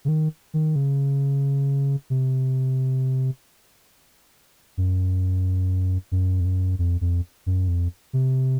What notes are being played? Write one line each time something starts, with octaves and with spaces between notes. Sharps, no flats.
C#3
D#3
D#3
C#3
C3
F#2
F#2
F2
F#2
F2
F2
F#2
F2
C3